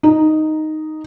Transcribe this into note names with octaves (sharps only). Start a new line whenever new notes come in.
D#4